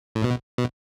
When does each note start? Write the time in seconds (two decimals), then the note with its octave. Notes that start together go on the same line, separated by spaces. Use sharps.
0.15 A2
0.24 B2
0.58 B2